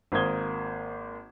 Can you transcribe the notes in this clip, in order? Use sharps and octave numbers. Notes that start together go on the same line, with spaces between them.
G#1 A#3 C5 D#6 G#6 G7